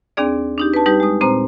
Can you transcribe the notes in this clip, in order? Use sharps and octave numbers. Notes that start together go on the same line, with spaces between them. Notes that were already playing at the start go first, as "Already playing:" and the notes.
D#2 C4 D4 G#4 D5
D4 D#4 G4
B4 A5
G3 D#4 G4 B4
G#3 D#6
A#2 C4 C5 A#5